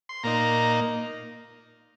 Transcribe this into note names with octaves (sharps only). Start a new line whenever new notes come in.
C6
A#2 A#3 D#4 A#5